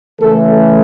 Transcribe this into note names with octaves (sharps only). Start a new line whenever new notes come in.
C#3 E3 A3 A4